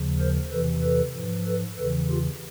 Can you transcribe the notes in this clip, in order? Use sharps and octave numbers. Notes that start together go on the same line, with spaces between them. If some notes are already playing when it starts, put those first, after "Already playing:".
Already playing: D#2 C#3 F3
A#4 C5
E2 C3 E3 A4 B4
A4 B4
G#2 F3
A4 B4
E2 C#3 E3 A4 B4
F4 G4